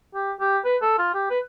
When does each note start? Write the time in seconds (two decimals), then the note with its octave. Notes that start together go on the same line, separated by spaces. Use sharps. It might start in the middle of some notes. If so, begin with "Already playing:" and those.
0.15 G4
0.40 G4
0.65 B4
0.82 A4
0.99 F4
1.14 G4
1.31 B4